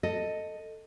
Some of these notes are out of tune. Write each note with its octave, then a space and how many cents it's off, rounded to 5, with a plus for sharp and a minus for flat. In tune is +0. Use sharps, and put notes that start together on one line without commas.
A4 +15 D#5 +0